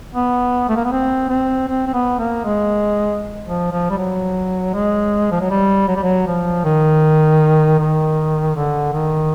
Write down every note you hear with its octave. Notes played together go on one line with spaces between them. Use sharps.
B3
A3
A#3
B3
C4
C4
C4
C4
B3
A#3
G#3
F3
F3
G3
F#3
G#3
F3
F#3
G3
F#3
G3
F#3
F3
D#3
D#3
D3
D#3